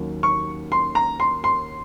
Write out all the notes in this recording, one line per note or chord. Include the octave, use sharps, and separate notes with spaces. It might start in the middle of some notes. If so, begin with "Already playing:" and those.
Already playing: D#2 D#3 F#3 A#3 C#4
C#6
C6
A#5
C6
C6